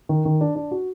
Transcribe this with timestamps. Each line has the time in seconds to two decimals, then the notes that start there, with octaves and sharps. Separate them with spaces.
0.09 D#3
0.25 D#3
0.41 D4
0.56 D4
0.71 F#4